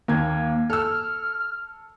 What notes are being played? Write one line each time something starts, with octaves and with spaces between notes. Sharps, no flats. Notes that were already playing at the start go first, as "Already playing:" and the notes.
D#2 A#3 G#6
A4 E6 F6